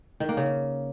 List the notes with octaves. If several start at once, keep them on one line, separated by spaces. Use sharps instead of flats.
D#3
A#3
C#3